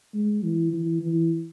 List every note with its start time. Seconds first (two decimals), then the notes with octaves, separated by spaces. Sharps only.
0.14 G#3
0.43 E3
0.73 E3
1.02 E3